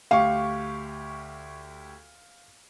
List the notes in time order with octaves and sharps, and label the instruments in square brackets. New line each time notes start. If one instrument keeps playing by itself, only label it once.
[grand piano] D2 G4 C#6 [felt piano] F5